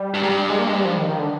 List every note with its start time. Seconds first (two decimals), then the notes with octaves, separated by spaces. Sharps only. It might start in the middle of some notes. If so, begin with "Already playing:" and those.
Already playing: G3
0.14 G2
0.23 G#2
0.29 G2
0.50 G#3
0.59 A#3
0.68 G#3
0.76 G3
0.85 F3
0.97 D#3
1.09 D#3
1.19 D3